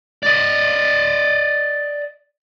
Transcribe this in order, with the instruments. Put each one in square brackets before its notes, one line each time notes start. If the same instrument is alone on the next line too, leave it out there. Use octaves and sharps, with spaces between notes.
[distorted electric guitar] D5 D#5